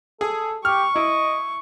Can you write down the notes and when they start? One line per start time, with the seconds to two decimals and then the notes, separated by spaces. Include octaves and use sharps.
0.21 G#4 A4
0.65 G4 C#6 F6
0.96 E4 D#5